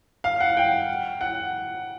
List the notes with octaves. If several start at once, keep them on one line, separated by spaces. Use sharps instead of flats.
F5
F#5
G5
F#5